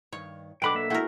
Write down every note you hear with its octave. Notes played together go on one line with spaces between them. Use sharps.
G2 D#3 C#5
B2 F#3 D4 A4 G5 B5 D6
A#3 E5
A3 E4 F#4 G#4 A#4